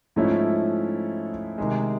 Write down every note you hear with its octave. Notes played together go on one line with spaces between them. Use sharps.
G#2 F3 A3 C#4 E4
C3 D#3 G#3